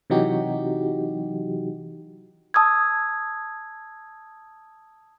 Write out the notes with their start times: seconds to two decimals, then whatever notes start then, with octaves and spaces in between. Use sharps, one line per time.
0.10 C3 E3 F#3 D#4 F#4 G4
2.54 A5 D#6 E6 G#6